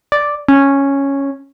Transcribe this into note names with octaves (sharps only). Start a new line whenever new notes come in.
D5
C#4